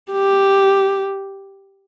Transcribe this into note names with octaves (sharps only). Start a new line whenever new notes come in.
G4